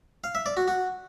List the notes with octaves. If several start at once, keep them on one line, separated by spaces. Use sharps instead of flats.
F5
E5
D5
F#4
F#4